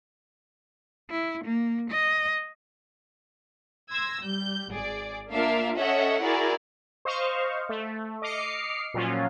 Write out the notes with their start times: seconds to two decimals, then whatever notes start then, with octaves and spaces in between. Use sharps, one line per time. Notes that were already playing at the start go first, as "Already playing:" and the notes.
1.10 E4
1.45 A#3
1.90 D#5
3.90 C6 E6 G#6 A#6
4.20 G3 G6
4.71 G#1 G#4 D5
5.32 A#3 D4 F4 A#4 E5 F5
5.78 C#4 A4 C#5 D#5 E5 F#5
6.22 E4 F#4 G#4 A#4 D5
7.05 C5 D#5 F5 C#6
7.69 A3
8.22 D#5 D6 F6 C7 C#7
8.94 A#2 F3 F#3 C#4 F4